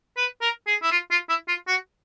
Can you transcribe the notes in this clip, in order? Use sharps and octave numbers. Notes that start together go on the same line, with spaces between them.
B4
A#4
G#4
E4
F4
F4
E4
F4
F#4